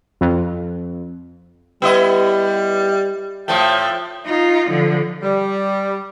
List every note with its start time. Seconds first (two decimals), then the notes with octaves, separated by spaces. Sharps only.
0.21 F2
1.82 G3 B3 E4 D#5
3.48 A2 F3 A3 G5
4.26 D#4 F4
4.70 D3 F3
5.22 G3